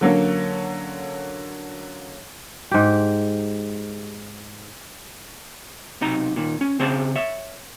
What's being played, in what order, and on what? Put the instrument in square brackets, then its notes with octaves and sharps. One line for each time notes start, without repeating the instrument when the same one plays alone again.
[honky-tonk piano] D3 F#3 A#3 C#4
[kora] G#2 G4
[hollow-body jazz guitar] B1 C3 D#4 A#5
A#2 D#3
C#4
C#3 C4 G#4 C5 A5
C#5 E5